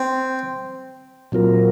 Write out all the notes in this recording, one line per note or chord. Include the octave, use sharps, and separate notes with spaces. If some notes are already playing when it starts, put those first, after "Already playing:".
Already playing: C4
A#2 F#3 C4 F4 A#4